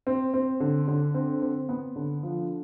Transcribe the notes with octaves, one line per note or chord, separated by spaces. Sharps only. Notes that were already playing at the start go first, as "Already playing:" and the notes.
C4
C4
D3
D3
C4
C4
B3
D3
F3